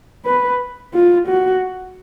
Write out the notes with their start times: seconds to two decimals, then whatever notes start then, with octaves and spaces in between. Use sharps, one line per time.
0.25 B4
0.94 F4
1.27 F#4